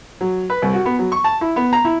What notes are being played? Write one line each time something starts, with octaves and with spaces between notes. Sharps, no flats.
F#3
B4
C2
F#4
B3
F#3
C#6
A5
E4
B3
A#5
E4